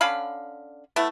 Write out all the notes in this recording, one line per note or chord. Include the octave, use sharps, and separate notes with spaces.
D3 C#4 F5 B5
A3 B3 E4